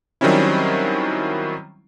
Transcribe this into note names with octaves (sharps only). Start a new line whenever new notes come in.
D#3 F#3 G3 C4 C#4 E4